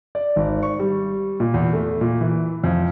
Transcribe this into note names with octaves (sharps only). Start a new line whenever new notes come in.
D5
G#1
C#6
G3
A#2
E2
A3
A#2
E3
F2